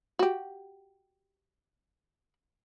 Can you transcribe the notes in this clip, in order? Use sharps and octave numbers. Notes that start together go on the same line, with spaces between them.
F#4 G4